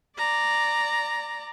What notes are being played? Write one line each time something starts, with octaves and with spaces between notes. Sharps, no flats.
D5 A#5